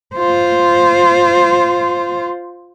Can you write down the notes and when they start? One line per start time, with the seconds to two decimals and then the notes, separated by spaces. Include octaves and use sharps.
0.16 F4 C5